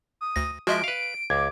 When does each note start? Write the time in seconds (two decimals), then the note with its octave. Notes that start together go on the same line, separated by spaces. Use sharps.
0.21 D#6
0.36 D2 A#6
0.67 F3 G#3 F#4 D#5 E5 D7
0.84 B4 F5
1.30 C#2 D6 G#6